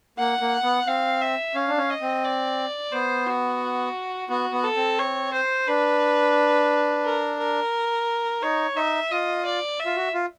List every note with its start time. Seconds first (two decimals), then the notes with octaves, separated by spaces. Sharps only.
0.18 A#3 F#5
0.41 A#3
0.64 B3
0.87 C4 F5
1.21 E5
1.55 C#4 F5
1.68 D4
1.78 C#4
1.90 D#5
2.01 C4
2.24 D5
2.92 B3 C5
3.27 F#4
4.30 B3 F#4
4.52 B3
4.64 A4
4.76 C4
4.99 C#5
5.33 C5
5.68 D4 B4
7.05 A#4
7.39 A#4
8.42 D#4 C#5
8.76 D#4 E5
9.11 F4 D#5
9.45 D5
9.79 E5
9.86 F4
9.96 F#4
10.14 F4